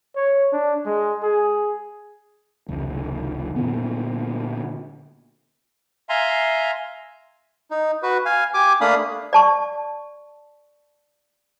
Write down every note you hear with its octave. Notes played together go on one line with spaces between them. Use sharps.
C#5
D4
G#3
G#4
F1 C#2
A#2 D3 B3
E5 F5 G#5 A#5 C6
D#4
F#4 B4
F5 G#5
G4 G#5 D6
A3 A#3 D4 F5 B5 D#6
D5 A5 C#6